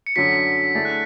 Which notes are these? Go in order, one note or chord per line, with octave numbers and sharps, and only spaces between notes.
C#7
F#2 D3 F#3 B6
D3 A3 E4 G#4 D5 A6
F#6